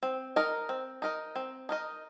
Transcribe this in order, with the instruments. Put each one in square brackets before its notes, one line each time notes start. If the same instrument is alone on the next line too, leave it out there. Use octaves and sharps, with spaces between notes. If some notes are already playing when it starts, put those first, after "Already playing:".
[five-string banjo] C4
D#4 A#4 D#5
C4
D#4 A#4 D#5
C4
D#4 A#4 D#5